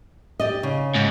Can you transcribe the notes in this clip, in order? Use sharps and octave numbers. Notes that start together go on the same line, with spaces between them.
G4 D5 D#5
C#3
G#2